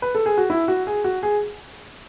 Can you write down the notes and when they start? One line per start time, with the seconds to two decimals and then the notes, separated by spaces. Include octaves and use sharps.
0.02 B4
0.15 A4
0.26 G#4
0.38 F#4
0.50 E4
0.68 F#4
0.87 G#4
1.04 F#4
1.23 G#4